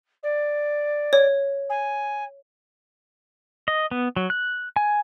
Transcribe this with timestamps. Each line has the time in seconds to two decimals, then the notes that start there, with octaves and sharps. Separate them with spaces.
0.23 D5
1.13 C#5
1.69 G#5
3.68 D#5
3.91 B3
4.16 F#3
4.30 F#6
4.76 G#5